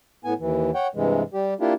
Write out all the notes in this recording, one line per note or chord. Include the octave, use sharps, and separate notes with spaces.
A2 B3 G#5
D#2 E3
C#5 F#5 G5
G2 C3 E3 G#3
G3 G4
A#3 D4 E4 F4 G4